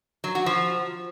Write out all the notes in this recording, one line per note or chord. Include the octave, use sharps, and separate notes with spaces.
F#3
F#4
F3